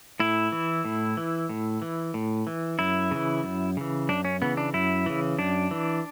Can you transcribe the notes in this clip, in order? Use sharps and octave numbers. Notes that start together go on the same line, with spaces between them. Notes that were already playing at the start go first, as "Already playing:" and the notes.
A2 E4
E3
A2
E3
A2
E3
A2
E3
F#2 E4
C#3 E3
F#2
C#3 E3
F#2 D4
C#4
C#3 E3 B3
D4
F#2 E4
C#3 E3
F#2 D4
E3